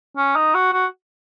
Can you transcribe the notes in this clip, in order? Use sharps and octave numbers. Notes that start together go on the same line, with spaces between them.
C#4
D#4
F#4
F#4